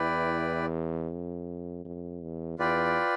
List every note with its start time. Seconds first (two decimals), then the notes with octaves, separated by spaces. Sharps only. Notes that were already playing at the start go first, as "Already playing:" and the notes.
Already playing: E2 E4 B4 D5 G5
1.11 F2
1.85 F2
2.22 E2
2.59 E2 F4 B4 D5 G5